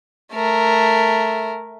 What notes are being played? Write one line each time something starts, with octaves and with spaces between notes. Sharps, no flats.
A3 A#4